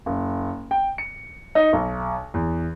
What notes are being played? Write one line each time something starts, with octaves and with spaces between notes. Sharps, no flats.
F#1
G5
C#7
D#4
B1
E2